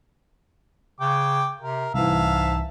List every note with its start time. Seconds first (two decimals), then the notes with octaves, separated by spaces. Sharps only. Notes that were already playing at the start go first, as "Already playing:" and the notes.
1.00 C#3 G5 D6
1.61 C3 A#4
1.94 C2 G#2 E3 E5 F5 A5